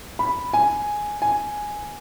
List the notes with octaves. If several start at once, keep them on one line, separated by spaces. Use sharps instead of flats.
B5
G#5
G#5